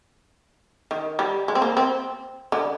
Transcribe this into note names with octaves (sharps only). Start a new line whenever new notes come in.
D#3
G3
G#3
C4
A#3
C4
D3